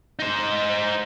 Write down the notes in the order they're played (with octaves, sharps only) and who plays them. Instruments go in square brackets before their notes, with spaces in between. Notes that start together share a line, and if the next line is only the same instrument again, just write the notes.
[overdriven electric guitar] D#4 C5